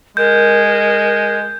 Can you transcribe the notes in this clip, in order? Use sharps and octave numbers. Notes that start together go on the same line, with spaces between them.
G#3 A#4 G6